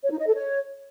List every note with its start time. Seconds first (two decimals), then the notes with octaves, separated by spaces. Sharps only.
0.03 C#5
0.11 D#4
0.19 D#5
0.27 A4
0.35 C#5